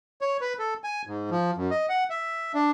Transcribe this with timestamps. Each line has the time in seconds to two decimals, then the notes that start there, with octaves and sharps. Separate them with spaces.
0.21 C#5
0.41 B4
0.59 A4
0.84 G#5
1.07 G#2
1.31 F3
1.57 F#2
1.71 D#5
1.89 F#5
2.10 E5
2.54 D4